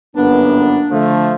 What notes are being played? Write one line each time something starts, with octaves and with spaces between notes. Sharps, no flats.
G1 F#2 A#3 B3 D4
D3 F3 A3